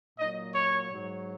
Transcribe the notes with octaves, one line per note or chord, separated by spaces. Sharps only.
A#2 F#3 D#5
C#5
G#2 F#3